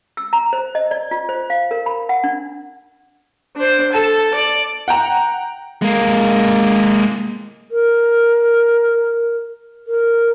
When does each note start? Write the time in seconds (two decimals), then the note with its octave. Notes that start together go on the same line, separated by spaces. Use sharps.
0.17 E6
0.33 A#5
0.53 C5
0.75 D#5
0.91 D5
1.11 F4
1.29 C5
1.50 F5
1.71 A#4
1.86 B5
2.09 F#5
2.24 D4
3.56 D4 C5
3.93 A4 A5
4.35 D5
4.88 F#5 G5 A#5
5.82 G#3 A#3
7.71 A#4
9.87 A#4